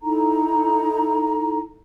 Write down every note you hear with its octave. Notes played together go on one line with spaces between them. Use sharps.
D#4 E4 A4 A#5